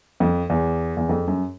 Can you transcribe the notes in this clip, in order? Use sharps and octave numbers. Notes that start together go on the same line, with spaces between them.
F2
E2
E2
F2
F#2